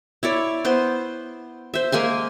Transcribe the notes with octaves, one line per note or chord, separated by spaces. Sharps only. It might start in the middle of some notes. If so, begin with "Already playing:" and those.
E4 C#5 D5
B3 C5 C6
C5 E5
G#3 A#3 G#5 C6